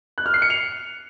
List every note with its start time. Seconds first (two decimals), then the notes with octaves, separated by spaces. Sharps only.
0.18 F#6
0.26 F6
0.34 C7
0.42 C#7
0.50 F7